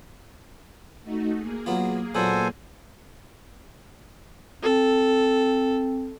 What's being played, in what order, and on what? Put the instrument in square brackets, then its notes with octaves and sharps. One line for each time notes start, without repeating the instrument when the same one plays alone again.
[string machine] A3 D#4 F#4
A#3 G#4
[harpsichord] F#3 B3 F4
[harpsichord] A#2 F#3 B3 [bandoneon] A4 C5 G#5
[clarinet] C4 [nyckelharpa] A4